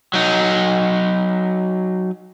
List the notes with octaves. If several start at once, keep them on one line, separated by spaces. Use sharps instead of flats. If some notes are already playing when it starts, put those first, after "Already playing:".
F#3 D#4